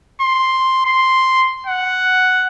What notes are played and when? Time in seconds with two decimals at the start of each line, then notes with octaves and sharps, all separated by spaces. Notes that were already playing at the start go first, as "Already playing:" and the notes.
0.21 C6
0.86 C6
1.66 F#5